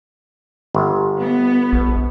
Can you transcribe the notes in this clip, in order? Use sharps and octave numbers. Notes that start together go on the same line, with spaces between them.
G1
B3
A#1